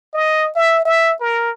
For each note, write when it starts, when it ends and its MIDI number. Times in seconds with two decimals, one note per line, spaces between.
0.14 0.50 75
0.56 0.83 76
0.85 1.13 76
1.20 1.51 70